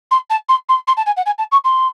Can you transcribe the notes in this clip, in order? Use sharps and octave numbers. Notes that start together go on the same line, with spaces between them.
C6
A5
C6
C6
C6
A5
G#5
F#5
G#5
A5
C#6
C6